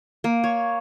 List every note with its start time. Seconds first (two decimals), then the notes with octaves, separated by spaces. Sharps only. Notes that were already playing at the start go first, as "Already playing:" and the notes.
0.24 A#3
0.44 C#5